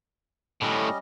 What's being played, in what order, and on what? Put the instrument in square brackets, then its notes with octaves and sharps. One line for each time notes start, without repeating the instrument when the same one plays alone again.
[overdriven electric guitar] A2 D3 [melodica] G3 C#4 D#5